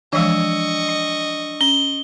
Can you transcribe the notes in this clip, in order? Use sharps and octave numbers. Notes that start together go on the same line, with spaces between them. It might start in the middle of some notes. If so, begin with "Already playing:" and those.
E3 F3 G#3 D4 D#5 C#6 E6
C#4 G7